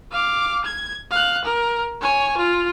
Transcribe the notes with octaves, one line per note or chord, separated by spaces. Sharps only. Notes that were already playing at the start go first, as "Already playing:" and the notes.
F5 D6
G#6
F5 F#6
A#4
C#5 G#5
F4